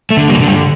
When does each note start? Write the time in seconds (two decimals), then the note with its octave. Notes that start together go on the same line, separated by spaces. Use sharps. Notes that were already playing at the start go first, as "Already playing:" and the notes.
0.10 A3
0.17 D3
0.28 G3 A#3
0.41 D3
0.47 G3